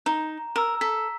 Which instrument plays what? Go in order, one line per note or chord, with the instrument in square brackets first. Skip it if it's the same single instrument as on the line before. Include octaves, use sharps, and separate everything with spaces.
[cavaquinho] D#4 [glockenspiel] A#5
[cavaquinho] A#4 [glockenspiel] A#5 E6
[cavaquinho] A4 [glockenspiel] B6